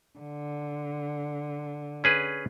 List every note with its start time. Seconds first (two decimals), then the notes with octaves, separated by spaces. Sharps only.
0.19 D3
2.04 C#4 G#4 B4